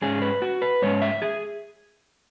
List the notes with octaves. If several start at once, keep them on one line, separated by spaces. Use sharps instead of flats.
G#2 G#3 C#4 G#4
B4
F#4
B4
G#2 G#3 C#4 C#5
E5
G#4